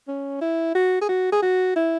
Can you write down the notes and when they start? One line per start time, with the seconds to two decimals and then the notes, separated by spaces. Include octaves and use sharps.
0.08 C#4
0.41 E4
0.75 F#4
1.01 G#4
1.09 F#4
1.32 G#4
1.42 F#4
1.76 E4